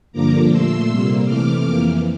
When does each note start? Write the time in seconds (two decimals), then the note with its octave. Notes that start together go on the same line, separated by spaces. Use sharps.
0.12 G2 D3 F3 A#3 A#5 D6
0.50 A#2 A3 C6 E6
0.88 C3 G3 A#3
1.26 C3 E3 A3 D6 F6
1.63 F2 E3 A#3